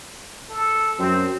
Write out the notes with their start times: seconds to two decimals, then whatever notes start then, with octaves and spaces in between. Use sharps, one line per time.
0.50 A4
0.99 F#2 C4